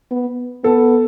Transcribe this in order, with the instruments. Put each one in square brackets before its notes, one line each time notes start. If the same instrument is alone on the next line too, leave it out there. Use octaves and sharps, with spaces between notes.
[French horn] B3
[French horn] B3 [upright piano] A4